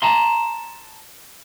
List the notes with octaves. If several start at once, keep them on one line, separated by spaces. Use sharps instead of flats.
A5 A#5 C6